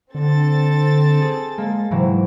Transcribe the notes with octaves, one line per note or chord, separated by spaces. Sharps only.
D3 C4 A4 A6
G#4
G#3 A#3
G#2 C3 E3 F#3